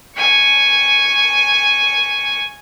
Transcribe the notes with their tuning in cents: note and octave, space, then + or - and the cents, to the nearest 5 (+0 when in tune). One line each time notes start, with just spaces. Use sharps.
G#5 +0 C#6 +0